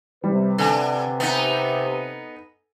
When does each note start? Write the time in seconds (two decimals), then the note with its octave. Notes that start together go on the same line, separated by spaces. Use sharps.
0.24 C3 G3 B4
0.58 D3 A4 G#5
1.20 B3 D#4